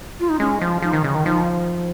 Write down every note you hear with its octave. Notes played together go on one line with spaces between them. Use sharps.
F4
D#4
G#3 C#4
F3
F3 D#4
D#3
C#3
D#3
F3 D#4